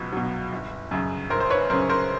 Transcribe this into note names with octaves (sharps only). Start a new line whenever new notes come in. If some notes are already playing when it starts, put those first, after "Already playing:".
Already playing: C#2 B2 F#3
B2 F#3
G1
F#2 C#3
G1 A#4 C5
C5
B4 C#5
F#2 C#3 A#4 C5
A#4 C5